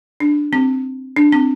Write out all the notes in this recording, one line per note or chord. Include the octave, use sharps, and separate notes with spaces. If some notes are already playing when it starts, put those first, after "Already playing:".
D4
C4
D4
C4